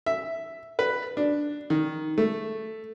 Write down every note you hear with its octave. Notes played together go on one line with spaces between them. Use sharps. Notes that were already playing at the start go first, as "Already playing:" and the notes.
E5
B4
D4
D#3
A3